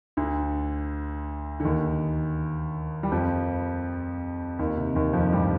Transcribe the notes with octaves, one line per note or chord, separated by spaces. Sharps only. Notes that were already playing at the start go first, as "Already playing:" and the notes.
D2 D3
D3
D#2 D#3
G3
F2 F3
D#2 D#3
C3
D#2 D#3
F2 F3
G2 G3